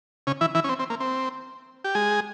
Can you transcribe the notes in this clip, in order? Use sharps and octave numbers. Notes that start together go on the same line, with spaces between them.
C#3 C#4
E3 E4
E3 E4
C#4
C4
C4
A#3
C4
G4
G#3 G#4